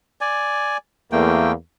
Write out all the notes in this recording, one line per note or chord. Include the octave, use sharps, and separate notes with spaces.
D5 G#5
E2 A3 A#3 G5